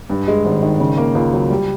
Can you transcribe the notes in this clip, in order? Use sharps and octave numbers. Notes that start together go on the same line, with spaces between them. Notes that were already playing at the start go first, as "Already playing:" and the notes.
G2
G#3
G#1
D#3
C#3
A#3
C#2
F#3
G3